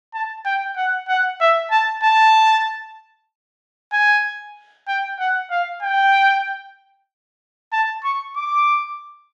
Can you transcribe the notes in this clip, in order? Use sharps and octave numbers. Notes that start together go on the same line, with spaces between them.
A5
G5
F#5
F#5
E5
A5
A5
G#5
G5
F#5
F5
G5
A5
C#6
D6